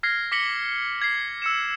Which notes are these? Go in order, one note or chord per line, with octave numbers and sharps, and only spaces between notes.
F6 G#6 A#6 C7
D6 A#6 B6 C#7 F#7 G7
G#6 C7
E6 C#7 E7